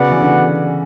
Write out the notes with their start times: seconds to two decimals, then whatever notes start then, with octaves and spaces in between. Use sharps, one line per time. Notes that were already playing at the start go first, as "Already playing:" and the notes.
Already playing: C#3 B3 F#4 B4 D5 F#5
0.10 E3
0.21 D3